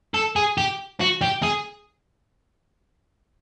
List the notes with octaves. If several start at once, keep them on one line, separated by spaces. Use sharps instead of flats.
A4
G#4
G4
F#4
G4
G#4